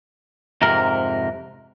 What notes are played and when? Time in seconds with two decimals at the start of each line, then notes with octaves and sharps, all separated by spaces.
0.62 F2 G#2 C3 A#4